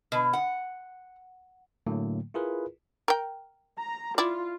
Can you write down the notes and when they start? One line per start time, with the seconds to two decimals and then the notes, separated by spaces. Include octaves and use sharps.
0.12 B2
0.33 F#5
1.87 A2 D3 F#3 A3 A#3
2.34 E4 F4 G#4 A#4 B4
3.08 A#4 G5
3.78 A#5
4.18 E4 F4 D5